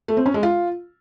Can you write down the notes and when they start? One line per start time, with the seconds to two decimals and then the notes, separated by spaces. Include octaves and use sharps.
0.08 A3
0.17 C4
0.26 C#4
0.34 G#3
0.43 F4